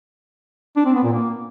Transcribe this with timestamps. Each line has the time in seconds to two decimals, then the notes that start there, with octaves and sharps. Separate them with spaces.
0.77 D4
0.86 C4
0.95 B3
1.04 A#2
1.13 A#3